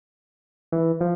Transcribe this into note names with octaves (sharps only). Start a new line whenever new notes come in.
E3
F3